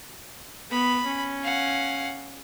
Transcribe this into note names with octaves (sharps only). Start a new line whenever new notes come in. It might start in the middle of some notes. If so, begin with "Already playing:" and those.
B3 B5
C#4
F5 F#5